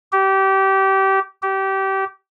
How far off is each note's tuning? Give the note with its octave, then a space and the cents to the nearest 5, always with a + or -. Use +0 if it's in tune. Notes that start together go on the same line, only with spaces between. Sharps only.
G4 -25
G4 -25